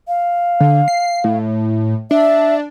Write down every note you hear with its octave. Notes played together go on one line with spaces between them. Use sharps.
F5
D3
C7
A2
D4 E5